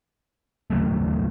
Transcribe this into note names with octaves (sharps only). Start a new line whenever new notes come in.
D#2 C#3 F#3 A3